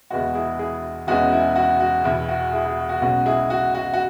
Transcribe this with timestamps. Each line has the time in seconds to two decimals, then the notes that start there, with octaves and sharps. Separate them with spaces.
0.10 E1 E2 E3 G#3 F#4
0.35 E4 G#4
0.59 E4 G#4
1.07 E1 E2 E3 G#3 C#4 F#4
1.32 E4
1.56 F#4
1.80 F#4
2.04 E1 E2 B2 E4
2.29 F#4
2.53 E4 G#4
2.65 E4 G#4
2.78 F#4
2.89 F#4
3.01 B1 B2 G#3 C#4 F#4
3.26 E4 G#4
3.50 F#4
3.75 F#4
3.94 F#4